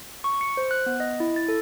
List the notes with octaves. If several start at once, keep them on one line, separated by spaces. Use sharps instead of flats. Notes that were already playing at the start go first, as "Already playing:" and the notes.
C#6
C#7
C5
F#6
B3
D#5
E4
A6
A4